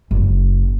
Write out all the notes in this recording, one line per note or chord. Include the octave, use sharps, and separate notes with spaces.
F#1